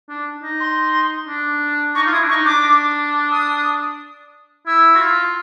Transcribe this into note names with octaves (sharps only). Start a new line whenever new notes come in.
D4
D#4
C6
D4
D#4 C#6
F4
E4 D#6
D4
D#4 C#6
D4 D6
D#6
E4 E6
F#4
F4